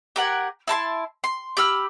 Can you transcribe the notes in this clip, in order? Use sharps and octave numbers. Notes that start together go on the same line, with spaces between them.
G4 A#4 F#5 G#5
E4 A5 B5 C6
C6
G4 B5 E6 F6